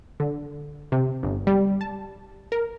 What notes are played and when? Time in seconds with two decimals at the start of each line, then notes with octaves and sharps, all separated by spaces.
0.20 D3
0.92 C3
1.23 G1
1.47 G3
1.81 A5
2.52 A#4